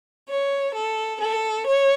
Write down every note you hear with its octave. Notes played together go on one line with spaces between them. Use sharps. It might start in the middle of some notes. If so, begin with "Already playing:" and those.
C#5
A4
A4
C#5